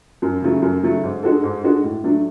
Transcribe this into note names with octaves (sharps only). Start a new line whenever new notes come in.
F#2
C#3 F#3 A3
F#2
C#3 F#3 A3
G#2
G#3 D4 F#4 A4
G#2
G#3 D4 F#4 A4
A2
F#3 A3 D4